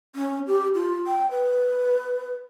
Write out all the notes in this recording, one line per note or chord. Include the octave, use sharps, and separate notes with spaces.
C#4
G4
F4
G5
B4